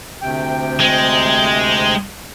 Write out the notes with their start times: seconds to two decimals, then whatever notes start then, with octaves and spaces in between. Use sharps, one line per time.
0.21 D2 C3 G5
0.80 G#3